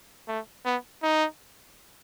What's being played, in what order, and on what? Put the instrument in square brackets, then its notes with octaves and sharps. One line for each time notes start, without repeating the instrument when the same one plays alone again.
[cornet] A3
B3
D#4